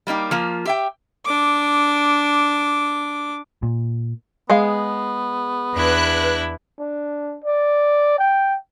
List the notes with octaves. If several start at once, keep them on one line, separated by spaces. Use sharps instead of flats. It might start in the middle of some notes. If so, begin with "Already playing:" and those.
G3 A#3 D#4 G4
F3 A#3 F4
G4 E5 G5
D4 D6
A#2
G#3 B3 G#4 F5
E2 D4 E4 B4 F#6
D4
D5
G5